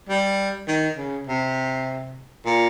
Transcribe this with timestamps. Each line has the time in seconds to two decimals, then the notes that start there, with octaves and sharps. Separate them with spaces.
0.09 G3
0.67 D#3
0.97 C#3
1.27 C3
2.46 A#2